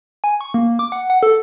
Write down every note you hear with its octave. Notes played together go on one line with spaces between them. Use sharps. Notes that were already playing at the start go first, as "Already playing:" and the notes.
G#5
C#6
A#3
D6
F#5
F#5
A4